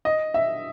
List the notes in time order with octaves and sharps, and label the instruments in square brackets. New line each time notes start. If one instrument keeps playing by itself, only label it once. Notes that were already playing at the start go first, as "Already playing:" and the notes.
[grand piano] D#5
E5